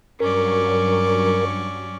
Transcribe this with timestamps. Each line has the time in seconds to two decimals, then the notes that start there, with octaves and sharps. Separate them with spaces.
0.20 G2 F#3 C#4 A#4 D5 C#6